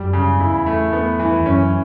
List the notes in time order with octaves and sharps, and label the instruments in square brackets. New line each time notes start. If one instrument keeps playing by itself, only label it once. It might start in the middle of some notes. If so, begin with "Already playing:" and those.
Already playing: [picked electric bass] F#2 [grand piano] G3
[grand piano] C#3
[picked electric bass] E2 [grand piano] E4
[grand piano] A3
B3
E3
[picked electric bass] E2
[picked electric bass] F#2 [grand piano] C#4